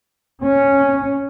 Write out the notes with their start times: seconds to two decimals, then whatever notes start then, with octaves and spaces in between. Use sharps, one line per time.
0.44 C#4